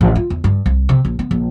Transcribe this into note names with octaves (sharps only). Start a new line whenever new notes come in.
A1
F4
E2
G2
C2
C3
A#1
B3
A#1